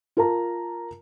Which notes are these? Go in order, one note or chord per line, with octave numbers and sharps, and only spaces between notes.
F4 A#4 A5 A#5